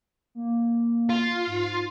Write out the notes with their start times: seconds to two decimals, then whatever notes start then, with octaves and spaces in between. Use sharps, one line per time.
0.35 A#3
1.09 F4
1.47 G#2